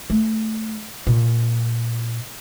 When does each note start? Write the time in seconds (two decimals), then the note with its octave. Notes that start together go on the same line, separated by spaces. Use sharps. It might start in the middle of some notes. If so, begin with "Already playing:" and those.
0.10 A3
1.07 A#2